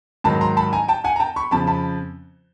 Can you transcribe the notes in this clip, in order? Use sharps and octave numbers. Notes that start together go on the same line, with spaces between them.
G#2 D#3 F#3 A5 B5
A#5 C6
A5 B5
G#5 A#5
G5 A5
F#5 G#5
A#5
G5 A5
B5 C#6
F2 C#3 F3 A5 B5
A5 B5